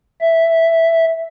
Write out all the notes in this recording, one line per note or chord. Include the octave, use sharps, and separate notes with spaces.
E5